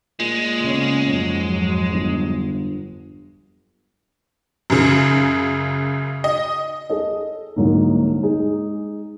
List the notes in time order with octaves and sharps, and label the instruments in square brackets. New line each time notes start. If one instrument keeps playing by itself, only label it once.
[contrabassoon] A#2 [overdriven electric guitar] G#3
[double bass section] C#3 B3 C#4
F2 G#2 F#3
[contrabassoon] G1
[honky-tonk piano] F#2 C#3
D#5
[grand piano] G#4 A4 D#5
C2 G#2 D3 F#3 A#3
G#3 D#4 G#4